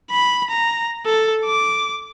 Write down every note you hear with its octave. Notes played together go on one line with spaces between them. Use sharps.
B5
A#5
A4
D6